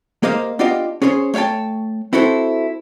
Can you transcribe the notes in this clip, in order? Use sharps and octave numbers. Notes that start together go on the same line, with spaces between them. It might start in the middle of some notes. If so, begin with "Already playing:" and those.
A#3 G4 C5 D#5 F5
B3 D4 F4 G4 D#5 F5
C#4 G#4 A#4 C5 C#5
A3 C#5 F5 G5 A5
C4 E4 F#4 A4 C5